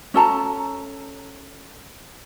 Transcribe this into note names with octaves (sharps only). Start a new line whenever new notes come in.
C#4 A4 A5 A#5